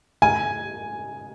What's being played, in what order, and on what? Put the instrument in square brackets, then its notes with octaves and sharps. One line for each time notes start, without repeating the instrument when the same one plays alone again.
[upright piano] G#5